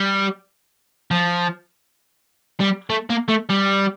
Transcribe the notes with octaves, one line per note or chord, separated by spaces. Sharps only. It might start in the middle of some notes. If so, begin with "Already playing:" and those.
Already playing: G3
F3
G3
A3
A#3
A3
G3